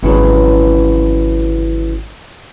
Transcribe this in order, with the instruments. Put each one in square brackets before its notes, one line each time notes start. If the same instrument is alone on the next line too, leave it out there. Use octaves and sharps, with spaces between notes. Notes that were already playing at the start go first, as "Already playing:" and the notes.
[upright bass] G#1 [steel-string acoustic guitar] C#3 E3 F#3